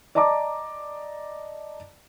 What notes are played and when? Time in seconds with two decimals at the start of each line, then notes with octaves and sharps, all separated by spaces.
0.15 D5 D#5 A5 A#5 D6